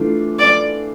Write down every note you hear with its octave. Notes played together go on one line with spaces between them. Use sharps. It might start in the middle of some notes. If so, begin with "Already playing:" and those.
Already playing: E3 A3 D4 F4
D5